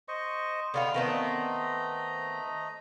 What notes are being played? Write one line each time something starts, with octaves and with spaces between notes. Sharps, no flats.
C5 D#5 C#6
D3 B3 F5 G5 C#6
D#3 A3 B3 C4 D#5 A#5